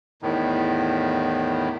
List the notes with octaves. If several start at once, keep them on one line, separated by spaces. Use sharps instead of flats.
E2 A2 D#3